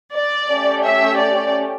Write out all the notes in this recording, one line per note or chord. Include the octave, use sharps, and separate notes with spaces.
D5
A3 C#4 G4
E5
D5